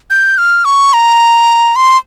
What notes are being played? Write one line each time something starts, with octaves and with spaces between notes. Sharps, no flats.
G6
F6
C#6
A#5
C6